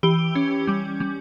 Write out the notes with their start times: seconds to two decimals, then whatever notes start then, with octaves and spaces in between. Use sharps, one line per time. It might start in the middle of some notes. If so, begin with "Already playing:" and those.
0.03 E3 G4
0.35 C#4
0.67 G3
1.00 G3